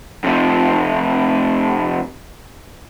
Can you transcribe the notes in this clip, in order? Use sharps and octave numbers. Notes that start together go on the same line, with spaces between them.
F2 C3